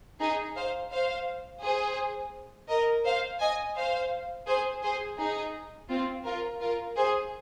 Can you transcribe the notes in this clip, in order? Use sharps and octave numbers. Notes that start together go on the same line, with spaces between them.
D#4 G#4
C5 F5
C5 F5
G#4 C5
A#4 D#5
C5 F5
D#5 G#5
C5 F5
G#4 C5
G#4 C5
D#4 G#4
C4 F4
F4 A#4
F4 A#4
G#4 C5